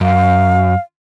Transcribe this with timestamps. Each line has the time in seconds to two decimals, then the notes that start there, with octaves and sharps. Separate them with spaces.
0.01 F#2 F5